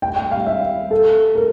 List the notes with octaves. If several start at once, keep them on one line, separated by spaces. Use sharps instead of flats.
G5
G5
F5
E5
A4
A#4